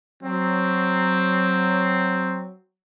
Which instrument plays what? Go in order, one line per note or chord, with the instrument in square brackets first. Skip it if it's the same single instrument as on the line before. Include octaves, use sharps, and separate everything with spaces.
[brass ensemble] F#3 [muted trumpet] C4